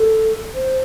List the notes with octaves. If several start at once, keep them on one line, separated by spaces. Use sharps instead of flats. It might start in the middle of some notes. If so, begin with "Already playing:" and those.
Already playing: A4
C5